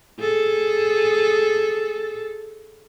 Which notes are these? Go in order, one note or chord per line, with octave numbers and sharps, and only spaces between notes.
G#4 A4